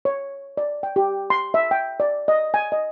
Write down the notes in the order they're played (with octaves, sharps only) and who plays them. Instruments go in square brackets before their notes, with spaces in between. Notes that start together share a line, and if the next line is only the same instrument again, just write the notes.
[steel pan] C#5
D5
G5
G4
C6
E5
G5
D5
D#5
G#5
D#5